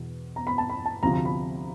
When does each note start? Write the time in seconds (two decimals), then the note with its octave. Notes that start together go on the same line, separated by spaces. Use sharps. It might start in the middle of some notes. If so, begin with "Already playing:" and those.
Already playing: E2 B2
0.36 A#5
0.47 B5
0.58 A5
0.69 B5
0.86 A5
1.03 D2 C3 F3 A#5
1.13 A#5
1.25 B5